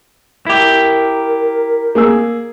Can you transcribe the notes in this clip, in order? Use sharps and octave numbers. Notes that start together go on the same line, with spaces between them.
E4 G4 A#4
A#3 G#4 E6